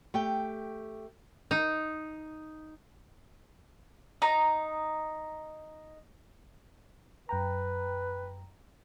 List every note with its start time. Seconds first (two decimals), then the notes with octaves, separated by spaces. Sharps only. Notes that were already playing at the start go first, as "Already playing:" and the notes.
0.14 A3 G4 G5
1.51 D#4
4.22 D#4 A#5
7.29 F#2 B4 G5 A#5